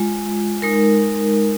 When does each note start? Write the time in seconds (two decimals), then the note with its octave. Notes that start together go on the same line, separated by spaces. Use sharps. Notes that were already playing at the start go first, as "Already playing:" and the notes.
Already playing: G#3 F4
0.62 G#3 D#4 A#4